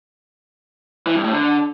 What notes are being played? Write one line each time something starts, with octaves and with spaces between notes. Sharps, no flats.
E3
G2
A2
D3